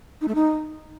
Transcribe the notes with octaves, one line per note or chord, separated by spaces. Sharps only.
D#4
A3
D#4